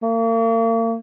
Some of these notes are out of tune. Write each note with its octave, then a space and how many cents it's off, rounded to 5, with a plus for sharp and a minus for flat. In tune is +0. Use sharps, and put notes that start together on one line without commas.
A#3 -40